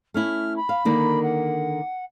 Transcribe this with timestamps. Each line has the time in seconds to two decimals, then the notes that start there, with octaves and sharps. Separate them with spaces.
0.14 A3 C#4 E4 F6
0.56 B5
0.69 F5
0.85 D3 D#3 A#3
1.23 F#5